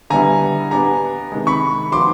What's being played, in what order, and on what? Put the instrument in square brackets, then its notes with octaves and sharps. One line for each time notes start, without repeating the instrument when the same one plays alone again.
[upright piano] D3 G3 B3 E4 [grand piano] G#5 A#5
[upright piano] B3 D4 G4 [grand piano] G#5 A#5
[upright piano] C3 D#3 G#3
[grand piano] B5 C#6
[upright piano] F3 A#3 D#4 F#4 B4 [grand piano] C6 D6